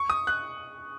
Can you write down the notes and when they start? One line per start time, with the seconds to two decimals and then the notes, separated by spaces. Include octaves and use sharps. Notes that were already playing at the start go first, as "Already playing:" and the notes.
Already playing: C#6
0.10 D#6
0.27 F#6